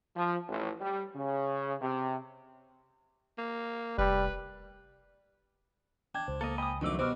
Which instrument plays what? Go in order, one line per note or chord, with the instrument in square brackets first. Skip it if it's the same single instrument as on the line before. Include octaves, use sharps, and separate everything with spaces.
[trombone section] F3
A1
G3
C#3
C3
[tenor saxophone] A#3
[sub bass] F1 [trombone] G3 [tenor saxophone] B4
[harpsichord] D4 [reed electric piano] G5 G#6
[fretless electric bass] C#2 [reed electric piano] C5
[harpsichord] A#3 [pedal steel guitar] A4 D#5
[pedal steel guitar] D#5 D#6 [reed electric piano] G5 G#5 B5
[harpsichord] F2 D6 [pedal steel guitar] D#3 F#3 A3 [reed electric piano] D4 E6
[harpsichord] B2 G3 [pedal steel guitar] F#4 D6 [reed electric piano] C5 E6 F6